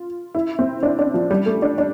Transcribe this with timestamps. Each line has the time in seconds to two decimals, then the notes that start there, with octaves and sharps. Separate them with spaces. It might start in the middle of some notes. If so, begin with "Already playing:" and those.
Already playing: F4
0.35 E4
0.59 C4
0.83 D4
0.99 D4
1.14 F3
1.31 G3
1.46 A3
1.62 D4
1.78 D4